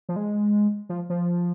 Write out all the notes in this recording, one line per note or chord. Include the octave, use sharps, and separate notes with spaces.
F3
G#3
F3
F3